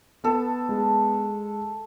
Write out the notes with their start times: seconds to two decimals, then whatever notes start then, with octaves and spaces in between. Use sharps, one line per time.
0.24 B3 A4
0.69 G#3